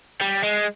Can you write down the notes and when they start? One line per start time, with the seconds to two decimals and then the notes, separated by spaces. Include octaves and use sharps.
0.21 G3
0.43 G#3